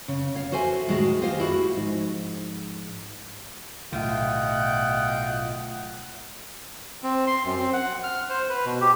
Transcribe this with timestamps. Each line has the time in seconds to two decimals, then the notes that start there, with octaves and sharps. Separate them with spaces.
0.08 C#3
0.35 C#5 F5
0.52 F#4 A4 C5 E5 G#5
0.87 D#2 A2 D#3 G#3 F#4 E5
1.22 F4 G4 G#4 C5 D#5 F5
1.40 E4 F#4
1.77 G#2 F3
3.92 B1 A2 D3 A3 F4 D#5 F#5 G5
7.03 C4
7.27 C6
7.44 F#2
7.59 C4
7.73 F#5
8.04 F6
8.30 C5
8.49 B4
8.65 B2
8.81 G4